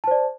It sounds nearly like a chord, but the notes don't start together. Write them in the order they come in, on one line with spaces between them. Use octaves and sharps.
A5 C5 D5